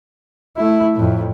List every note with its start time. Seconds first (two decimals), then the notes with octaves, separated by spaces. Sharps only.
0.57 A3 E4
0.95 F2 A2